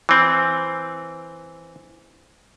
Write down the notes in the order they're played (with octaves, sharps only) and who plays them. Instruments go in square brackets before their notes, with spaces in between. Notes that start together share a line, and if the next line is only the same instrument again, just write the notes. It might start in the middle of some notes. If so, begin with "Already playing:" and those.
[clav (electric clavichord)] E3 C4